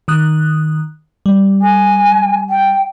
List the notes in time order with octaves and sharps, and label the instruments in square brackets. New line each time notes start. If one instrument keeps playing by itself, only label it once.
[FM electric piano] D#3 D#6 F#6
G3
[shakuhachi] G#5
G5